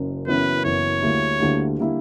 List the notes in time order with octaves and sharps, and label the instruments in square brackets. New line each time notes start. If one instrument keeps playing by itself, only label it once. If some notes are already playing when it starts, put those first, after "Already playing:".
Already playing: [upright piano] F#1 F#2
[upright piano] F#1 F#2 E3 B3 [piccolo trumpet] B4
[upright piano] F#1 F#2 E3 B3 [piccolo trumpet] C#5
[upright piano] D2 D3 G3 A#3 E4
D2 D3 G3 A#3 E4
D3 G3 A#3 E4